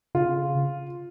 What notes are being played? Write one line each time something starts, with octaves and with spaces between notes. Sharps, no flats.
C#3 F4